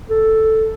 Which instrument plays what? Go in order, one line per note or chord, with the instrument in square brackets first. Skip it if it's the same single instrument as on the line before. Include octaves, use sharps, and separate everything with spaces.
[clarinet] A4